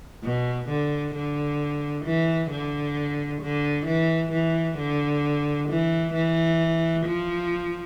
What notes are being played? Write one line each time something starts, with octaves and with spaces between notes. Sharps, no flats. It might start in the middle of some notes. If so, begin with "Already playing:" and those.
B2
D3
D3
E3
D3
D3
E3
E3
D3
E3
E3
F3